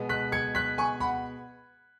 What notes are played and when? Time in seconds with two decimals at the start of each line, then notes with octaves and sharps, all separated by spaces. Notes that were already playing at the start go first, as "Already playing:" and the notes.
Already playing: B2 G#3 B3
0.09 F#6 B6
0.32 G#6 C#7
0.55 F#6 B6
0.78 G#5 C#6
1.00 F#5 B5